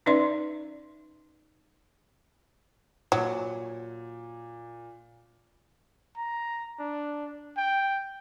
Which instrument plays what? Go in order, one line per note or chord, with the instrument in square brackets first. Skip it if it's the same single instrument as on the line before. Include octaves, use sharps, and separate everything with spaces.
[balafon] C#4 D#4 B4 D5 E5 C6
[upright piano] A#2 [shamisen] F#3
[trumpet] A#5
D4
G5